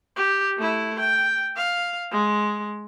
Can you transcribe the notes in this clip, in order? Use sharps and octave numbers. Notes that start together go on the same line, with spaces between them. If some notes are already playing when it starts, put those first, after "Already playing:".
G4
A3 E4
G5
F5
G#3